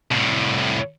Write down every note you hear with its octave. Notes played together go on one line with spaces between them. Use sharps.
C2 A2